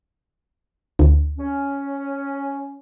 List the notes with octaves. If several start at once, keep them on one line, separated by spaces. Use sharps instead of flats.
D2
C#4